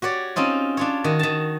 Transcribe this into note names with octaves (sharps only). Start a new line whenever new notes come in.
F#4 G4 C#5 D5
C4 C#4 D#4 F4
D4 F4 C#5
D#3 F#4
D#3 A5